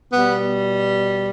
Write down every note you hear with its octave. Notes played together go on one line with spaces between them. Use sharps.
B2 G3 B3